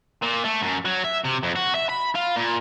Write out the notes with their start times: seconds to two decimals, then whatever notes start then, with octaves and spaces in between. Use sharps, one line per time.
0.22 A#2
0.44 A3
0.62 F#2
0.85 F#3
1.05 E5
1.25 C3
1.43 F2
1.56 F#4
1.75 E5
1.89 B5
2.15 F4
2.36 A#2